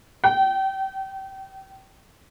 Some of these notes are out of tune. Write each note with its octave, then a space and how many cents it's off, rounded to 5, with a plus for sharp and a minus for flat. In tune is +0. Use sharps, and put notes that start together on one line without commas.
G5 -25